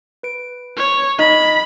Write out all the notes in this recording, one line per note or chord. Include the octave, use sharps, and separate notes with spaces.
B4 D7
C#5
D#4 D#5 B5